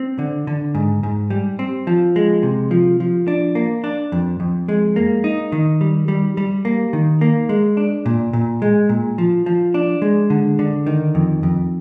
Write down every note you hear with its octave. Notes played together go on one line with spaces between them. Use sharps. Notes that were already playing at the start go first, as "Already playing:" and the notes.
Already playing: C4
D3
D3
G#2
G#2
G3
C4
F3
G#3
C3
F3
F3
D4
A#3
D4
F2
F2
G#3
A#3
D#4
D#3
G3
G3
G3
A#3
D#3
A#3
G#3
D4
A#2
A#2
G#3
A#2
F3
F3
D4
G#3
D3
D3
D#3
F2
F2